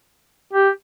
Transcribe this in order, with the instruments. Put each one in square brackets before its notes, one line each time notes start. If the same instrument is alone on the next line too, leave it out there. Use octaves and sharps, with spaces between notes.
[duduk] G4